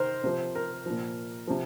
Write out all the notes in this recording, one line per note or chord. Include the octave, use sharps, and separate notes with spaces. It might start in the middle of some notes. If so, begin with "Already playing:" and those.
Already playing: D#3 A#4 C5
C3 F3
A#4
A#2 F3
C3 F3